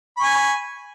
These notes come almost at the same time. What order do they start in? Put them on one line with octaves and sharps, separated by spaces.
B5 C#6 G#5